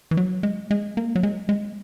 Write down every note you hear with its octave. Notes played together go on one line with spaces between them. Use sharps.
E3
F#3
G#3
G#3
A#3
F#3
G#3
G#3